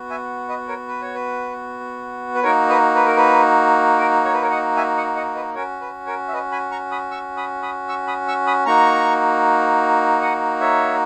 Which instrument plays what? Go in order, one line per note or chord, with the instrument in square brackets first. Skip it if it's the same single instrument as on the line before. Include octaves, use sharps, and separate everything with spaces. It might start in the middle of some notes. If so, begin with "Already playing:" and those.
Already playing: [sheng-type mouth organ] B3 F#4
E5 G#5
B4 D#5
A#4 C#5
B4
C#5
B4
B4
A#3 D#4 F#4 A#4 C#5
B4 D#5
B4
A#4
B4
A#4
C#5
B4
A#4 C#5
D#5 F#5
E5 G#5
D#5 F#5
D#5 F#5
B4 D#5
C#4 F#4 A#4 C#5
B4
A#4 C#5
E5
B4 D#5
G#5 B5
A#5 C#6
B5 D#6
C#6 E6
B5 D#6
B5 D#6
C#6 E6
B5 D#6
C#6 E6
B5 D#6
A#3 D#4 F#4 A#5 C#6
D#5 F#5
C#5 E5